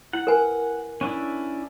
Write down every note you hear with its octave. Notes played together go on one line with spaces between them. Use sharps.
E4 F#5
A#4 B4 G#5
C#4 D4 E4